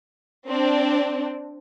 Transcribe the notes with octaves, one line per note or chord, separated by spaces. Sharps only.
C4 D4